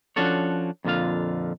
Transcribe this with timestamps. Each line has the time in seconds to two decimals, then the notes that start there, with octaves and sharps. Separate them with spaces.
0.16 F3 C#4 D4 F#4 A4 C#5
0.84 F2 A#2 D3 F4 F5